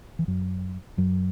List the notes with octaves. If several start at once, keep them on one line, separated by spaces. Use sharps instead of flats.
E3
F#2 F#3
F#2 F#3